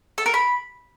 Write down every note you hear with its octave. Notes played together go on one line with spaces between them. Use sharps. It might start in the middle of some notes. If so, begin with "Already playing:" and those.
A4
A#4
B5